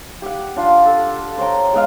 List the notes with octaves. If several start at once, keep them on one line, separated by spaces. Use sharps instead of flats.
G4 F#5
D4 F4
A4
C5 C#5 G5 A#5
G#3 B3 D#5 F5